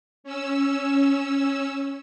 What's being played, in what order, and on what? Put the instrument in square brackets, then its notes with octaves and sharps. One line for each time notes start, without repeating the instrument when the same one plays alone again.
[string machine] C#4 E6